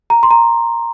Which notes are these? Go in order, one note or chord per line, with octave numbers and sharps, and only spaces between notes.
A#5
C6
A#5